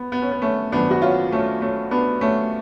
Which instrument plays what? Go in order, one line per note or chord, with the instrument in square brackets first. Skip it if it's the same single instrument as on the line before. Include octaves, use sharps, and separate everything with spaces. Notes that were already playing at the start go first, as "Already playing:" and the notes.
Already playing: [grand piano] B3
B3
C#4
B3
A3 C#4
G#1 F#2 F3 A3 B3 D4
F#4
C#4 F4
A3 C#4
A3 C#4
B3 D4
A3 C#4